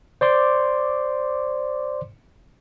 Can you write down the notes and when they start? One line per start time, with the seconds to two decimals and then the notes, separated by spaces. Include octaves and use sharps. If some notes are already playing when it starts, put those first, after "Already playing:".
0.21 C5 D5 C6 D6